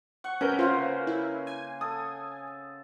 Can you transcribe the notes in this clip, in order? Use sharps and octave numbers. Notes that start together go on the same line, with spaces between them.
F#5 C#6
C3 C#4 A#4 B4 G6
C#3 A#3 F4 C5
E4
G#5
A4 D#6